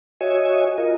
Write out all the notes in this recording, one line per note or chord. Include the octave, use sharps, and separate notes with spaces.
F#4 C#5 D#5 E5 G#5
F4 A#4 D#5